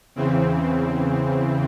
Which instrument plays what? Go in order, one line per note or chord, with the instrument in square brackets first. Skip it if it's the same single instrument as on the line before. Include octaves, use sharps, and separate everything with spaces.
[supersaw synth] E2 C#3 E3 C4